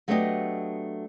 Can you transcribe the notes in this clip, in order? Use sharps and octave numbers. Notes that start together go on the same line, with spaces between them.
F#3 A3 B3 D4 G4 D#5